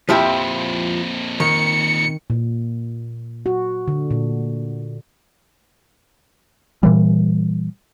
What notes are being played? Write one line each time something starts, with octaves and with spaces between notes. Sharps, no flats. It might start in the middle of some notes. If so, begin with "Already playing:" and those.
F2 A#2 F3 C4 E4 G4 E5 G5
D#3 C#7
A#2
F#4
D3
A#2
A#2 E3 G3